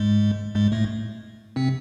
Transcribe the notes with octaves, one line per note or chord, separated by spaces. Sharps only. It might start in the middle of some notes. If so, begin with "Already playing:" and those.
Already playing: G#2 G#3
G#2 G#3
A2 A3
C3 C4